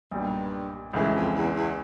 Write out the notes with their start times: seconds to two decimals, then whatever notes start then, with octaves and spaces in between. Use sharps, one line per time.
0.11 B1 G2 A#2 G3
0.93 C#2 A2 C#3 E3 G#3
1.14 F2
1.34 E2
1.54 E2